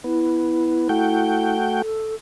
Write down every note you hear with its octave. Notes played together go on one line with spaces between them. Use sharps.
B3 E4
A3 F#4 G5
A4